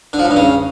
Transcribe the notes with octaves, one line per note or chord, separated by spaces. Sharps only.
D3
F3
A2
G2
C#3